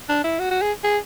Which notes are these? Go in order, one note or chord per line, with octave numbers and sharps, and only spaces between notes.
D4
E4
F#4
F#4
G#4
G#4